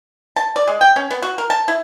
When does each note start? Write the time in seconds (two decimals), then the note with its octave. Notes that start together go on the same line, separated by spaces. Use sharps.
0.36 A5
0.56 D5
0.67 G#3
0.81 G5
0.96 C#4
1.11 B3
1.22 F#4
1.38 A#4
1.50 A5
1.68 E4